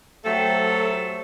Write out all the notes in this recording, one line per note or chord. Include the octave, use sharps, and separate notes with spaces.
C3 F#3 A3 A4